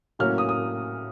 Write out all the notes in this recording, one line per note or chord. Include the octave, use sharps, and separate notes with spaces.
A2 F#3 A#3 C#4 F6
D#6
D#6